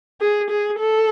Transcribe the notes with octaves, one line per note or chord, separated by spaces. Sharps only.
G#4
G#4
A4